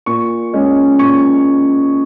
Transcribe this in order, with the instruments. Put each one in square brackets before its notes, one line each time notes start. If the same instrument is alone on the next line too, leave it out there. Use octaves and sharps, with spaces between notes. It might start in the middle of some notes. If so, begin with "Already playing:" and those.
[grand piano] A#2 C#6
G#3 C#4
A#2 C#6